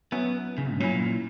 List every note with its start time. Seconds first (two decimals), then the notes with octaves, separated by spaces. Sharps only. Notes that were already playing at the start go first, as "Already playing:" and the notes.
0.12 F#3 B3 C#4 E4
0.58 C#3
0.73 G2
0.80 A#2 F#3 C#4 E4